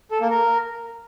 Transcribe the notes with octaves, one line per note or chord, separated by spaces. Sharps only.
A4
A#3
A#4